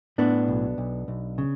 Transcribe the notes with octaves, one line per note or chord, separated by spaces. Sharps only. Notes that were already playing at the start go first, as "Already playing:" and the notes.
A2 B3 D4
B1
B1
B1
C#3